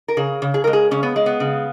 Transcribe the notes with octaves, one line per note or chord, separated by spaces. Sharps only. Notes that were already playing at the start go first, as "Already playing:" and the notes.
A#4
C#3 G#4
C#3
G#4
G#3 A#4
G#4
C#3 C#4
B3
G#3
B3
C#3